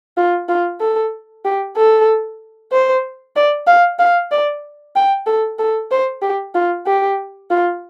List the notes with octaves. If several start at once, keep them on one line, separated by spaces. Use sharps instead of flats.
F4
F4
A4
G4
A4
C5
D5
F5
F5
D5
G5
A4
A4
C5
G4
F4
G4
F4